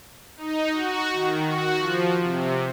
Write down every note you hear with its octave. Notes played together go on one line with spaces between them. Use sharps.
D#4
F#4
D#3
F#4
F3
C3